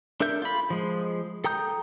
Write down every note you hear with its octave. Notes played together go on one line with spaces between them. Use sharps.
D4 A4 A#4 E5 G6
F4 B5
F3 G#3
A4 G5 A#5 D#6 G6